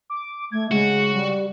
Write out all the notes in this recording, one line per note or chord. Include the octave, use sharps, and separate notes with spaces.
D6
A3 G#6
C#3 G#3 F#4
G3